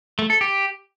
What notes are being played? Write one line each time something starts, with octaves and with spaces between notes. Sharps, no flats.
A3
A4
G4